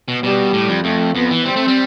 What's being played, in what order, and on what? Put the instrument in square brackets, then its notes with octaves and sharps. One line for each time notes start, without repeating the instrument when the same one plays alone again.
[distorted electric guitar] B2
[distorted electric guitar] B2 [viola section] G3
[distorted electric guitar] A2
F2
[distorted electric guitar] F2 [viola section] A3
[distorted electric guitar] F2 [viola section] B3
[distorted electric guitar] E3
[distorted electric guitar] G3 [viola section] C4
[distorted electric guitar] A3
G3